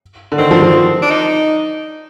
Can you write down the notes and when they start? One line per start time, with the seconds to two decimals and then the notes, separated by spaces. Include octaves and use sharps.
0.32 D3
0.38 D#3 C4
0.51 F3
0.62 F3
1.02 D4
1.11 D#4